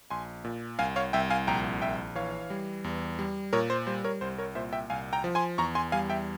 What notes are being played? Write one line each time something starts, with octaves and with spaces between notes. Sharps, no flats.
A#1 G#5 C6
A#2
C2 F5 G#5
C#5 F5
C2 E5 G5
F5 G#5
A#1 G5 A#5
A#1 E5 G5
E3 C#5 F5
G3
E2
G3
A#2 A#4 C#5
C5
G3 C5
A#4 C#5
C2 C5
A#4 C#5
A#2 C5 E5
E5 G5
C2 F5 G#5
G5 A#5
F3
G#5 C6
E2 A#5 C#6
G#5 C6
G3 F5 G#5
E5 G5